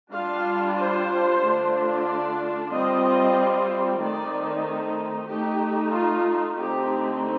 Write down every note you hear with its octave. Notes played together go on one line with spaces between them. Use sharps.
G3 D4 F4 F5
C5
D3 A3 D4 F4
D5
G3 C4 F4 D#5
D#3 A3 C4 D#4 D5
A3 D#4 G4
F4
D3 A3 C4 D#4 G4